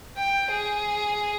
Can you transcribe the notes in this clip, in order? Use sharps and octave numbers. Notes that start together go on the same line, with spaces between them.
G5
G#4